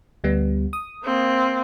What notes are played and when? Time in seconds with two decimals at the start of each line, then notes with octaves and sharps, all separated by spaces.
0.24 D2 G3 B3
0.73 D#6
1.04 A#3 C4